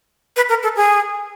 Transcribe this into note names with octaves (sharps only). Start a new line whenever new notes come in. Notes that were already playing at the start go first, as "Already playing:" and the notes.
B4
A#4
A4
G#4